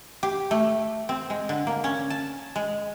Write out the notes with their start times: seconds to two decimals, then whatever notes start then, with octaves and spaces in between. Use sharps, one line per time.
0.23 G4
0.51 A3
1.09 C4
1.30 G#3
1.49 D3
1.67 A#3
1.84 C#4
2.10 A5
2.56 G#3